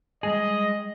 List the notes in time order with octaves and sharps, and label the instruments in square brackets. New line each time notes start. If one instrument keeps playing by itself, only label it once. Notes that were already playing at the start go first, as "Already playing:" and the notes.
[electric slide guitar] G3 G#3 G#4 [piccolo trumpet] D#5